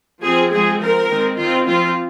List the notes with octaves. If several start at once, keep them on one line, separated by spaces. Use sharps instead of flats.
F3 C4 G#4
F3 G#3 C4 G#4
F3 C4 A#4
D#3 G#3 C4
D#3 C4 F4
F3 C4 F4